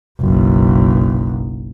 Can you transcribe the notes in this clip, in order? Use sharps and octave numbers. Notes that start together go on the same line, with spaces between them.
F#1 B1